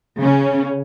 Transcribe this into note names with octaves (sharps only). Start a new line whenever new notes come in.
C#3 C#4